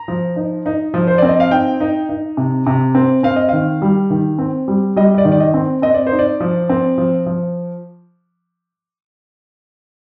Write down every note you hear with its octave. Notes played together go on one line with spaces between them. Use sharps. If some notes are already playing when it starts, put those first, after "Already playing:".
Already playing: A#5
F3
D#4
D#4
F3
C5
C4 D5
D#5
F5
D#4 G5
D#4
D#4
C3
C3
C4
C4 F5
D#5
D#3 F5
G3
D#3
C4
G3
G3 D#5
D#5
D5
D#3
D5
D#5
C4
C4 D#5
D5
C5
D#4
D5
F3
C4
F3
F3